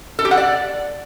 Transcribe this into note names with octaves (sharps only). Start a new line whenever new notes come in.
A4
G4
F#5
D5